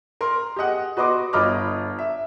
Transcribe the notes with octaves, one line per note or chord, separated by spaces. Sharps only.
A#4 C6
G4 G#4 D#5 F#5
F#4 B4 D#5 C6 D6
G1 F4 D#5 B5 D6 F6
E5